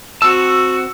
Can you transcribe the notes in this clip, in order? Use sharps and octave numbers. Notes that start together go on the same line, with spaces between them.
C4 F#4 A5 E6